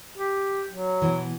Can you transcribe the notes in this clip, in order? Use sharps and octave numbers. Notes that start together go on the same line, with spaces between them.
G4
F#3
B2 E3